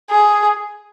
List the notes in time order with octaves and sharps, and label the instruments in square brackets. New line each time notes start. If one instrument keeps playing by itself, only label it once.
[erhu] G#4